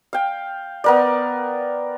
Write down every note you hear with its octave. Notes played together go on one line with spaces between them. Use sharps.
F5 G5
B3 A#4 D5